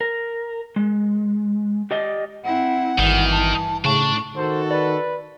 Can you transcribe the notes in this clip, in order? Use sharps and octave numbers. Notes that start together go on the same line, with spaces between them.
A#4
G#3
G4 D5 D#5
C4 E4 F#5
G#1 G2 D#3 E3
A5
A2 C#3 D4 A5 C#6
D#3 F#4 A4 C5
B4 D5